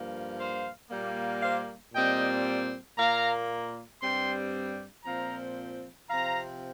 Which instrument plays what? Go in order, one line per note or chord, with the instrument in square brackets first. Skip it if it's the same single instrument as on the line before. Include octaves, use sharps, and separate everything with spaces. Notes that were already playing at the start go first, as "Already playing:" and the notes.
Already playing: [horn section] G2 F3 A#3
C5 F5
A#2 G3 A#3
C5 F5
A#2 G3 C4 D#5 G5
A#2 A#3 F5 A#5
G2 G3 C4 G5 C6
A#2 F3 C4 F5 A#5
C3 F3 C4 F5 A#5